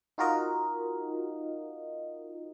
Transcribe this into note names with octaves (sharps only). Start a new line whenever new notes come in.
D#4 F4 F#4 A#4 D#5